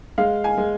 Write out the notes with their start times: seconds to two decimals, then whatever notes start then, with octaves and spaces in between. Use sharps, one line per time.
0.18 G#3 F5
0.44 G#5
0.58 G#3